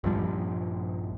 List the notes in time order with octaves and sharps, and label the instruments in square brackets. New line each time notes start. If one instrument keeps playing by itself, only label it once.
[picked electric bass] A#1 G2 F3 G3